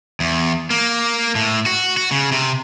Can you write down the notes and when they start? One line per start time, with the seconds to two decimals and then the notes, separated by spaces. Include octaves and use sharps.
0.20 E2
0.70 A#3
1.35 A2
1.66 F#4
1.97 F#4
2.11 C#3
2.32 C3